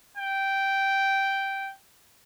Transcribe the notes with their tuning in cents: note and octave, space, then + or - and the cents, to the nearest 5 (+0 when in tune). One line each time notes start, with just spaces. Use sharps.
G5 -5